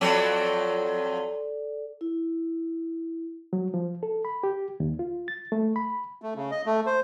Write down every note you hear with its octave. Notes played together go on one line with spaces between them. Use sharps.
F2 F#3 C4 A4 D5
E4
F#3
F3
A4
B5
G4
D#2
F4
A6
A3
B5
A3
C#3
D#5
A3
C5